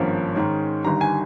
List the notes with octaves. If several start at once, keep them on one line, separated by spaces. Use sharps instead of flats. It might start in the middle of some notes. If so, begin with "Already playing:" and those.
Already playing: G#1 G2 F3 A#3 C#4
G#2 D#3 G#3 C#4
G1 G2 D#3 G3 A#5
G#5